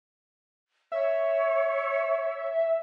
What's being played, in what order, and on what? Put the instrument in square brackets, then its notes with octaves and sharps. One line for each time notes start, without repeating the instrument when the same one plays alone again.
[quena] C#5 [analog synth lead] E5